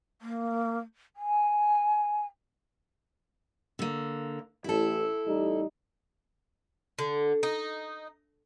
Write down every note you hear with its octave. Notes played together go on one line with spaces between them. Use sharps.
A#3
G#5
D3 A#3
A1 E4 A4
A1 G3 D#4
D3
D#4